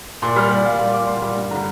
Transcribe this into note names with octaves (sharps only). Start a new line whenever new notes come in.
A#2 C6
G3 F6
A#2 D5
G3 F5
A#2 C6
G3 D6
A#2 C6
G3
G2
D3 G3 A#5